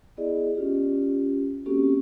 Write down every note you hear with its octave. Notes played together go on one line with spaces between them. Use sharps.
B3 E4 G#4 D5 D#5
C#4 F4 G4
A#3 C4 C#4 F#4 G4 A4